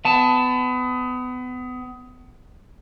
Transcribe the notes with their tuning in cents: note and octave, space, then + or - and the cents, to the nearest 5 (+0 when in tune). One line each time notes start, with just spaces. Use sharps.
B3 +30 A5 +0